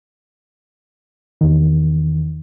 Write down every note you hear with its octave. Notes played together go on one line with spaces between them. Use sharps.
E2 D#3